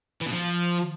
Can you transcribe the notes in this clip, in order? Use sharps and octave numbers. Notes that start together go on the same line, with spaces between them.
E3
B2
F3